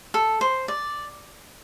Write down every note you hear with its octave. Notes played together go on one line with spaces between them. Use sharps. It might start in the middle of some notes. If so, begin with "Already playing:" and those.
A4
C5
D5